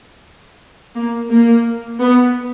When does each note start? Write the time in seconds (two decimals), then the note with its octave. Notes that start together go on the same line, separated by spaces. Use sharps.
0.95 A#3
1.30 A#3
2.00 B3